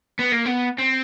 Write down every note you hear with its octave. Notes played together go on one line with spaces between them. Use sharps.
B3
A#3
B3
C4